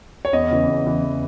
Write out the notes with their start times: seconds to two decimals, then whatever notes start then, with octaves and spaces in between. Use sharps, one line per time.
0.25 C#5
0.33 E2 D#5
0.51 C#3 E3
0.68 E2
0.85 C#3 E3
1.02 E2